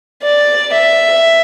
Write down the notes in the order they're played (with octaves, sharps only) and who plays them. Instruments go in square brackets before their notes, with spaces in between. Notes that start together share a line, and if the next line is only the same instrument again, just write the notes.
[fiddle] D5
E5